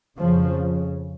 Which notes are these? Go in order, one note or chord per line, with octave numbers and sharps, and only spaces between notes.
F2 C#3 F3